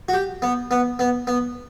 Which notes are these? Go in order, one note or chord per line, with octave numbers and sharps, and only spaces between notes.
F#4
G4
B3
B3
B3
B3